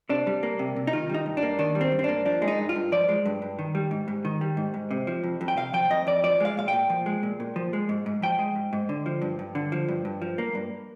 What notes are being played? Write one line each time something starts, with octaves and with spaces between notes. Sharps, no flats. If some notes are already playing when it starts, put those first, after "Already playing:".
C3 D4
G3
A#3
C3
C3
D#4
D#3 F4
G3 D#4
G2
D4
A#3
D#3 D4
G3
C4
G2
C4
A#3 D4
F3 D4
G#3
D#4
G2
F4
G2
F3 D5
G#3
G2
G2
D#3
G3
G#2
G#2
D#3
G3
G#2
G#2
C3
F3
F2
F2
G5
C3 F5
F3 G5
F2 D#5
F2 D5
F3 D5
G#3 F5
A#2 F5
G5
A#2
F3
G#3
A#2
A#2
F3
G#3
G#2
G#2
F3 G5
G#3
G#2
G#2
D3
F3
G2
G2
D3
F3
G2
G2
F3
A#3
G2